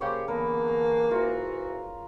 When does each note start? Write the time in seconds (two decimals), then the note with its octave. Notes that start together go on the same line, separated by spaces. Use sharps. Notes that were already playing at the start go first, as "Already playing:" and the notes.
0.01 C#3 A#3 G4 C5 C#5
0.28 D3 E3 A#3 B3 A#4
0.68 A#5
1.11 G#2 E3 F4 F#4 A#4